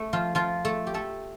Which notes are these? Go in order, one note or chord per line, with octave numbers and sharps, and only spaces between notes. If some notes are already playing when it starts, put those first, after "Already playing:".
Already playing: A3
F3 F4
F3 F4
A3 A4
G4
A3 A4